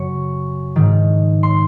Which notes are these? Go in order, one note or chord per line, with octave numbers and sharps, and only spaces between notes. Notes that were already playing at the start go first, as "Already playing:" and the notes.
Already playing: F#2 C#3 C#6
G#2 D#3
C6